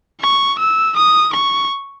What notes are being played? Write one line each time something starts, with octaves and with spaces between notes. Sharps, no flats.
C#6
E6
D#6
C#6